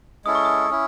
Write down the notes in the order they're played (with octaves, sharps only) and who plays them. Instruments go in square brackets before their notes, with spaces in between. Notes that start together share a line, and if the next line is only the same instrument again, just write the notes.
[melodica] G#3 C#4 E4 A4 [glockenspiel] D#6
[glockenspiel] C#6
D#6
[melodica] C#4 E4